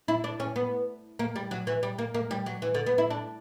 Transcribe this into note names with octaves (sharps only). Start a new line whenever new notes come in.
E4
D4
C#4
B3
A#3
G3
F#3
E3
G3
A#3
A#3
G3
F#3
E3
D3
B3
E4
D4